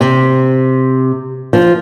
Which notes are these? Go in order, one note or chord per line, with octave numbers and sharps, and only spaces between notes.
C3
F3